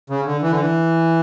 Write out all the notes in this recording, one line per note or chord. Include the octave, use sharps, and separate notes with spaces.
C#3
D3
E3
D3
E3